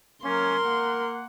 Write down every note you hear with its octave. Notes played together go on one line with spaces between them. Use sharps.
F#3 A#3 C#4 A#4 C6
A#3 F#5